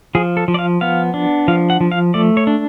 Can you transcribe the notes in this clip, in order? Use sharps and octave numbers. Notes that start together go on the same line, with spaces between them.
F3 G#4
A4
F3
D5
F5
B3 F5
D4
F3 F5
F#5
F3
F5
A3 D5
C#5
D4